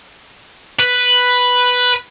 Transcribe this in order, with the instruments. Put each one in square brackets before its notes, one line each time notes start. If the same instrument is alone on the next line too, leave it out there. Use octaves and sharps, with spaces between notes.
[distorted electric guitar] B4